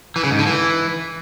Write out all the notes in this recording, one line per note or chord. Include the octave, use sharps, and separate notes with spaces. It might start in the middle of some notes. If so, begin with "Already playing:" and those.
E3
C#3
G#2
D3
E3